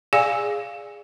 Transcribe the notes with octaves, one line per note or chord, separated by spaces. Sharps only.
G#4 D5 F5 G#5